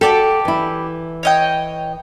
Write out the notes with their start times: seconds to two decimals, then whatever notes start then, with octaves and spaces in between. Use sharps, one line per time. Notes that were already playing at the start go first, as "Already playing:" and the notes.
0.01 F#4 G4 A4 D5 A5
0.45 E3 E4
1.23 C#5 D#5 G5